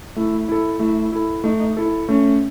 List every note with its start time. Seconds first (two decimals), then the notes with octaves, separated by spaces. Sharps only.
0.16 A3 E4
0.49 E4 A4
0.80 A3 E4
1.12 E4 A4
1.44 A3 D#4
1.77 E4 A4
2.08 A3 C#4